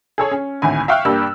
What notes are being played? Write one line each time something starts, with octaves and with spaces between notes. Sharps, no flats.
G#4 A4 C#5
C#4
G#1 D2 A2 G#5
E5 F5 G5 C#6 F6 F#6
G2 A#3 D4 G4 G5 E6